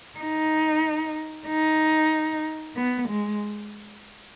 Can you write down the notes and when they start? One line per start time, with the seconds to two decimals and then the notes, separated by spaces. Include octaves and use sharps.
0.19 D#4
1.48 D#4
2.76 B3
3.09 G#3